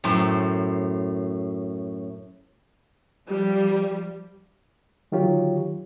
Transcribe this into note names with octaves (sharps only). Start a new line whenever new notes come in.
F#2 A2 C5
F3 G3
D3 D#3 F#3 F4 G4 C#5